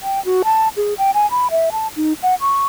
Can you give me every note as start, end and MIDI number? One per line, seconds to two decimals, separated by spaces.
0.02 0.23 79
0.25 0.42 66
0.44 0.68 81
0.77 0.94 68
0.98 1.11 79
1.14 1.29 80
1.31 1.48 83
1.51 1.70 76
1.72 1.88 81
1.96 2.13 63
2.23 2.35 78
2.41 2.67 85